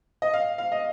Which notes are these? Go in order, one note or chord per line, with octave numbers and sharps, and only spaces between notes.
D#5
F5
F5
D#5